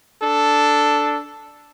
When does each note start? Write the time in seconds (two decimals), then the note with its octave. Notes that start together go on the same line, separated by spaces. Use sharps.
0.22 D4 A4